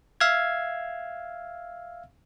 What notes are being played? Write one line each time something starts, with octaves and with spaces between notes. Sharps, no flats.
E5 F5 E6 F6 G#6